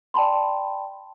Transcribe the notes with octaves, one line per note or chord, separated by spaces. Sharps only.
D5 G5 A5 B5 C6